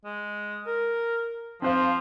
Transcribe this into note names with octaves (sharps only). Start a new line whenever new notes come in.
G#3
A#4
F3 C4 C5 F5